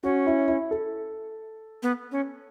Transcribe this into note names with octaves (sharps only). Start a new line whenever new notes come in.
C#4 F#4
E4
E4
A4
B3
C#4